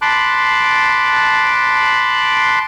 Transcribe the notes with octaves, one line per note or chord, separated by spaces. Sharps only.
A5 B5 C6 D6 F#6